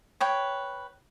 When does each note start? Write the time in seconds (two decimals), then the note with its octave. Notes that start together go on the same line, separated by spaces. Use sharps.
0.20 B4 C#5 G5